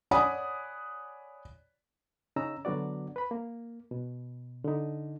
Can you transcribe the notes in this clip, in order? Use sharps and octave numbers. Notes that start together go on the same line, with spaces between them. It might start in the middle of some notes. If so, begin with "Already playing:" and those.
C#5 D5 F#5 G#5 B5 D#6
C#3 C#4 D#4 A#5 E6
D3 F#3 B3 F#4 D5
B4 B5
A#3
B2
D3 D#4